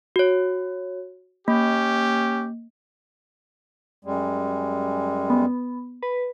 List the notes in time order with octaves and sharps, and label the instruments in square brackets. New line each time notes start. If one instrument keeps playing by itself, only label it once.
[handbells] F#4 C#5
[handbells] A#3 [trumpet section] C#4 G4
[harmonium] F#2 G3 G#3
[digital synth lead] B3
B4